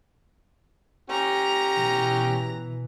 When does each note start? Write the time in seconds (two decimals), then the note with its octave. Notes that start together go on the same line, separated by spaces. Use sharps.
1.10 C#4 G4 A#5
1.72 B2 E3